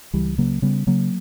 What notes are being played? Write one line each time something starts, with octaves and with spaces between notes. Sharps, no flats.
C#2 E3 G3
C#3 F#3 A#3
C#3 G3 B3
C#3 F#3 A#3